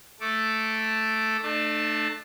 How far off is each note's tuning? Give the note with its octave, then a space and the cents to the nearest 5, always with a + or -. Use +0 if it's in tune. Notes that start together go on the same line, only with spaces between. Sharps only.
A3 +0 A4 +0 D6 +0
A3 +0 D4 +40 A5 +0